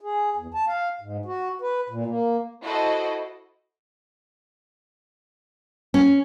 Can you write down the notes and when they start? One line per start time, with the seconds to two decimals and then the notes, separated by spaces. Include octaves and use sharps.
0.01 G#4
0.36 E2
0.54 A5
0.67 F5
1.01 G#2
1.26 F#4
1.61 B4
1.89 A#2
2.07 A#3
2.64 E4 F#4 A4 C5 D#5
5.94 C#4